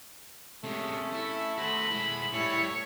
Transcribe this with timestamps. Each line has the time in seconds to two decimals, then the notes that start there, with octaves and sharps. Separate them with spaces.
0.64 C3 G#3 A3 C#4
1.13 E4
1.58 F#4 C5 B5
1.90 G#3 E4
2.33 A2 G3 E4 C#5